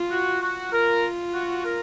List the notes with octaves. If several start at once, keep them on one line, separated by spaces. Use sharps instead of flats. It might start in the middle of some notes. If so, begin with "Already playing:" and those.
Already playing: F4
F#4
F#4
F4 A#4
F#4
A#4